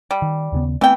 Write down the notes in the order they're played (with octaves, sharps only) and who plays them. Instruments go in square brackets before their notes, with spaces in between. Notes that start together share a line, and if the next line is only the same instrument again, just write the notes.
[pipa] G3
[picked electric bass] D#3
D#2 C#3 B3
[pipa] E3 G5 [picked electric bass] A3 B3 C4